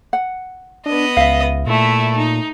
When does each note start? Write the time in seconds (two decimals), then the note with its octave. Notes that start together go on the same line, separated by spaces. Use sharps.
0.13 F#5
0.86 B3 D4 D#5
1.17 C#2 E5 F5
1.67 A#2 A3 E4
2.17 D#4